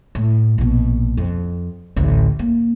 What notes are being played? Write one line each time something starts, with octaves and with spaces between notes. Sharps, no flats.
A2
A#1 B2
F2
A1 D2
A#3